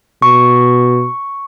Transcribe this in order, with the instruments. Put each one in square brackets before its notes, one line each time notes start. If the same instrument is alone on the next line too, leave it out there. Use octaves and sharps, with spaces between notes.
[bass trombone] B2 [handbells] C#6